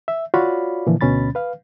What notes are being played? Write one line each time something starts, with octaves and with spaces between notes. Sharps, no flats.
E5
F4 F#4 C#5 D5 F5 B5
A#2 D3 E3 F3
D2 B2 C#4 B5 A6
B4 F5